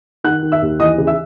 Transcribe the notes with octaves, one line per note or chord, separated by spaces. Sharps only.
D#3 F#5 F#6
D#3
E5 E6
D#2
E3 D#5 D#6
C#3
E5 E6